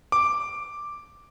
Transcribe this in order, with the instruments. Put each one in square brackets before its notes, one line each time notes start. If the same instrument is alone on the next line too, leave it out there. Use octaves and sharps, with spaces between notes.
[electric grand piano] D6